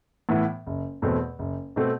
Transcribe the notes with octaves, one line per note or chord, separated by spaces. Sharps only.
A2 E3 B3
F#1
E2 B2 A3 C4
F#1
B2 A3 C4